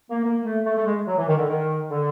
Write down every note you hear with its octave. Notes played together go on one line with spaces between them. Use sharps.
A#3
A#3
A3
A3
A3
G#3
F#3
E3
D#3
D3
D#3
D3